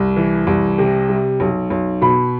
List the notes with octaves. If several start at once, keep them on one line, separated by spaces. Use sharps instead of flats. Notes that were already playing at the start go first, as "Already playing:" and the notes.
Already playing: C2
E3
C2
C3
G3
B1
B1
B2 B5